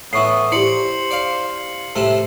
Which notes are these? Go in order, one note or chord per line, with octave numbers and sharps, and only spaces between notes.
A2 E3 B3 C#6 C7
E4 G4 C5 D5 C7 C#7 F#7
D5 F5
A2 C3 A3